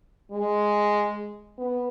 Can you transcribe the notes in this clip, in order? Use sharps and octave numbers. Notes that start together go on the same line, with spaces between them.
G#3
B3